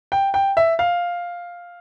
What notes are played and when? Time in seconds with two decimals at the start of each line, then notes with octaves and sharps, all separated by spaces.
0.12 G5
0.34 G5
0.57 E5
0.79 F5